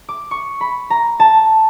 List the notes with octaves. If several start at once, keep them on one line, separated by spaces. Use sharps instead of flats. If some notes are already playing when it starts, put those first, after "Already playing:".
D6
C#6
B5
A#5
A5